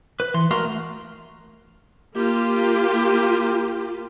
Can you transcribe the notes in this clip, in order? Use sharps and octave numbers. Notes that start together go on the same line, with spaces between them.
B4
E3 C6
G#3 A3 F#4 A#4 F5 C6
A3
A#3 F4 G4